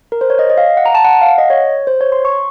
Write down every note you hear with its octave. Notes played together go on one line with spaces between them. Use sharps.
A#4
C5
C#5
D#5
D#5
F5
F#5
A#5
A5
F#5
F5
F#5
D#5
C#5
C5
C#5
C6
C#6